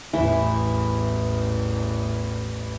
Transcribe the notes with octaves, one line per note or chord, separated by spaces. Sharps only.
A1 E2 E3 E4